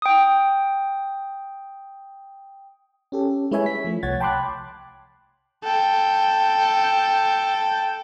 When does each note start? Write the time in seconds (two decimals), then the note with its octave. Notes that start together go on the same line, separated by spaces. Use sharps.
0.02 G5 D#6
3.12 C#4 G4 A4
3.51 G#3 E4 B4 C#5 E5 G#5
3.66 B6
3.85 F3 A3
4.03 C2 C#5 F#5 G#6 A6
4.20 G5 A5 B5 C6 D6 F#6
5.64 A4 G5